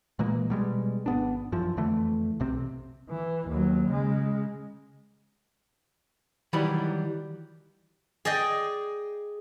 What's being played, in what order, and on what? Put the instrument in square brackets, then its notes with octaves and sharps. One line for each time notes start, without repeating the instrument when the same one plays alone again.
[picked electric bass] A#2 E3 G#3 A#3
B2 G3 G#3
G#1 B3 D4
F#2 E3 F3
F2 D3 E3 A3
B1 C3 C4
[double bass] E3
D#2 F#3
C#3 G#3
[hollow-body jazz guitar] D#3 E3 F#3 G3 B5
[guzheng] G#4 D5 D#5 G5